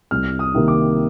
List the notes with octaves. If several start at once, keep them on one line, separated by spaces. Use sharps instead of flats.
C2 F6
D#6
C3 D#3 A#3
D6